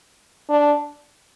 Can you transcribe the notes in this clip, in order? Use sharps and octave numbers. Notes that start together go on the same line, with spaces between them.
D4